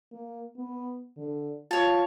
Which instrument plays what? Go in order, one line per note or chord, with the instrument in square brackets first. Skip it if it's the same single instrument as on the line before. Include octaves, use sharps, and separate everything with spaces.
[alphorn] A#3
B3
D3
[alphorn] F4 [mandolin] C#5 A5